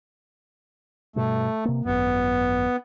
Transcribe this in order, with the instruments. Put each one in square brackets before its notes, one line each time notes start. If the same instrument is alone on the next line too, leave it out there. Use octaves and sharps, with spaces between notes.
[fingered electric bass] G2 B2 [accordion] A3
[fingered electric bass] C3 A#3
[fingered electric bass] G#1 F#2 [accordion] B3